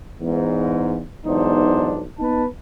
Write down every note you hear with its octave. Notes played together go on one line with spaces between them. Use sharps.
E2 G#2
B1 E2 G#2 D4 D#4 C5
B3 D#4 B4 A5